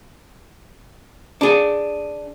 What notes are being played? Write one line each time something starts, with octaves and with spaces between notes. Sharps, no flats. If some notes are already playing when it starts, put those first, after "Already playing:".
D4 G#4